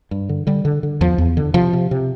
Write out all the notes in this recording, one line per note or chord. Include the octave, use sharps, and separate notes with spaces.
G2
D3
D3 G3
D3
D3
E2 F3
E2
D3
C3 F3
C3
C3